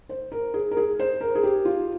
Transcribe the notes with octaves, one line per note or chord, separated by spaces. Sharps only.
C5
A#4
G#4
A#4
G#4
C5
A#4
G#4
G4
F4